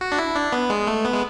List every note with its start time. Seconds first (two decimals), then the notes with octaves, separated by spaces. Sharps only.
0.01 F#4
0.12 D4
0.18 E4
0.36 D4
0.53 B3
0.70 G#3
0.87 A3
1.05 B3
1.13 G#3